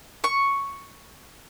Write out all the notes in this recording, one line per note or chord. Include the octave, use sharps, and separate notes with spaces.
C#6